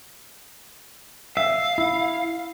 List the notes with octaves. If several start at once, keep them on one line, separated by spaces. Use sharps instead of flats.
E5 F5
E4